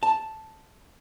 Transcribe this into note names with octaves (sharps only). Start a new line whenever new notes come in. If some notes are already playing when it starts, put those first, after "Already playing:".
A5